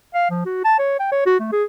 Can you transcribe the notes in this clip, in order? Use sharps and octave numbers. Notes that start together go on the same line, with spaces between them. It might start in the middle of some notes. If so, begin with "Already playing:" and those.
F5
F3
F#4
A5
C#5
G5
C#5
F#4
A3
G#4